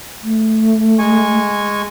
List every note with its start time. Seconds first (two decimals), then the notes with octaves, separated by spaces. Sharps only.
0.23 A3
0.99 G#3 G#5 C#6